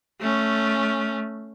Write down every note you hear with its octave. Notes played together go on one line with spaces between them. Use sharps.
A3 C#4